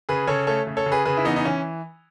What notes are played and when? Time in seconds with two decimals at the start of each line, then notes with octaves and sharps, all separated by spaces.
0.09 C#3 G#4 B4
0.27 C#3 A4 C#5
0.47 A3 A4 C#5
0.67 C#3
0.77 A4 C#5
0.86 C#3
0.92 G#4 B4
1.05 C#3 G#4 B4
1.17 E4
1.25 E3 B3 D#4
1.36 D#4
1.45 E3 C#4